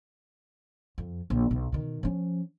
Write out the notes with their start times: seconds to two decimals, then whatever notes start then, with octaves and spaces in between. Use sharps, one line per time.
0.98 F2
1.30 A#1
1.51 B1
1.72 B2 D#3
2.03 F3 C#4